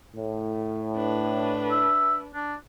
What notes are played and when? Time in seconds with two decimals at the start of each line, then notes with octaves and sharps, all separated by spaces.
0.15 A2
0.96 D4 B4
1.71 E5
2.34 D4